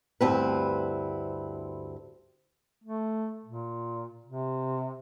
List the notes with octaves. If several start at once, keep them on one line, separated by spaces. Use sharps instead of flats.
D2 G2 C4 E4 B4
A3
A#2
C3